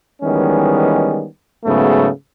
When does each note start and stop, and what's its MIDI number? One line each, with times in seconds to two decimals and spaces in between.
0.22 1.25 51
0.22 1.25 52
0.22 1.25 55
0.22 1.25 56
0.22 1.25 59
0.22 1.25 61
1.65 2.07 44
1.65 2.07 49
1.65 2.07 54
1.65 2.07 57
1.65 2.07 59